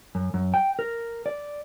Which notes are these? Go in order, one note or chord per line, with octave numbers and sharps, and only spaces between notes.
F#2
F#2
G5
A#4
D5